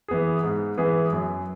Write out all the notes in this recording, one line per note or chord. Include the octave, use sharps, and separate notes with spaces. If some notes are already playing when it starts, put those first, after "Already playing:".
E3 B3 G#4
G#2
E3 B3 G#4
F#2